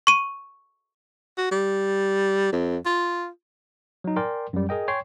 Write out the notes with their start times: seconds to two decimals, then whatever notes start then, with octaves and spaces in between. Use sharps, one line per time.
0.07 C#6 D#7
1.37 F#4
1.51 G3
2.52 F2
2.86 F4
4.04 F#3 D#4
4.16 A#4 D5 G5 G#5 C6
4.53 F#2 G3
4.69 G#4 A#4 D#5 G5
4.88 C#5 G5 G#5 C6 C7